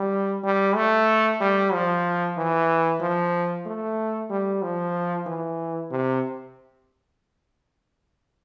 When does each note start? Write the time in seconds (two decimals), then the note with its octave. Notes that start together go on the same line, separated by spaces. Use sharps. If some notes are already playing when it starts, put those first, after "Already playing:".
Already playing: G3
0.44 G3
0.76 A3
1.41 G3
1.73 F3
2.38 E3
3.01 F3
3.66 A3
4.30 G3
4.62 F3
5.26 E3
5.91 C3